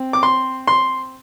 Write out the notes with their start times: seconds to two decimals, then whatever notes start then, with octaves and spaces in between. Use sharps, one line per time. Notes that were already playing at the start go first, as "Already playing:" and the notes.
Already playing: C4
0.13 D6
0.23 C6
0.68 C6